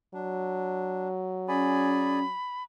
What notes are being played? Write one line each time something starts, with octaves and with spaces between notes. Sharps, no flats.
F#3 D4
C#4 G#4 D5 G#5 B5